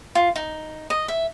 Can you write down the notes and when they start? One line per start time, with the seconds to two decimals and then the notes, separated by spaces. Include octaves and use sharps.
0.15 F4
0.36 D#4
0.90 D#5
1.08 E5